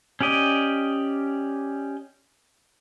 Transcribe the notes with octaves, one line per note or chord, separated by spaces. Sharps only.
C#4 G4 D5 D#5